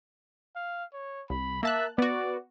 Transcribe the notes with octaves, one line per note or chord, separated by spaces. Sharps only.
F5
C#5
C2 B5
A#3 E5 A5 F#6
B3 F#4 D5